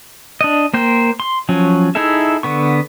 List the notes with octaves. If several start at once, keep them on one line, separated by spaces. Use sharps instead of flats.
D4 D#5
A#3 A#4 C5 G5
C6
F3 F#3 C#4
D#4 E4 G#4 A4 E5
D3 B3 C#6